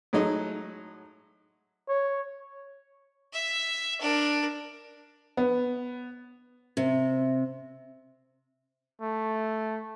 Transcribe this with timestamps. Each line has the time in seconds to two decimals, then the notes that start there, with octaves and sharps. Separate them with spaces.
0.13 A2 F#3 G#3 D#4
1.88 C#5
3.33 E5
4.01 D4 A#4
5.37 B3
6.77 C3
9.01 A3